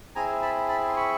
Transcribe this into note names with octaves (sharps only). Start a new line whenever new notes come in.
C4 E4 G#4 G#5 A#5
A5 B5
A5 B5
C6
B5 C#6